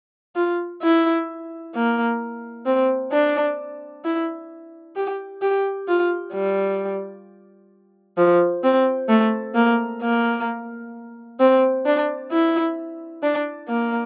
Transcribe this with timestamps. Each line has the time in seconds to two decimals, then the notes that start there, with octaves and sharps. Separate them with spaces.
0.36 F4
0.83 E4
1.75 A#3
2.66 C4
3.12 D4
4.04 E4
4.95 G4
5.42 G4
5.88 F4
6.34 G3
8.17 F3
8.63 C4
9.09 A3
9.55 A#3
10.02 A#3
11.40 C4
11.86 D4
12.32 E4
13.23 D4
13.69 A#3